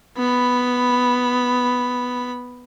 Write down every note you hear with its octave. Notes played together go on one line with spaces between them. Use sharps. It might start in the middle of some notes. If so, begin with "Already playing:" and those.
B3 B5